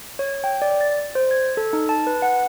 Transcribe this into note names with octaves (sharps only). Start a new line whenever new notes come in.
C#5
G5
D5
A6
C5
G#6
A4
D#4
A5
B4
F#5